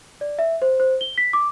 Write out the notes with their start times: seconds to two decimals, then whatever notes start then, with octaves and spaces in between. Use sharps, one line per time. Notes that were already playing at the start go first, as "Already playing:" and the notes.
0.21 D5
0.39 E5
0.62 C5
0.80 C5
1.01 G7
1.18 B6
1.33 D6